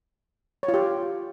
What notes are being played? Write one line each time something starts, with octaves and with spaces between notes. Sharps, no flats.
C#5
F4
G4